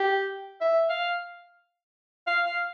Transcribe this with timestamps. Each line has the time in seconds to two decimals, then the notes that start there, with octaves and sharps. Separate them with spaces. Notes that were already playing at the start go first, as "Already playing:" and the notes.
Already playing: G4
0.61 E5
0.89 F5
2.27 F5
2.46 F5